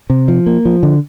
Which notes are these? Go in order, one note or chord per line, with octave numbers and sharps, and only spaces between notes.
C3
F3
A#3
F3
D3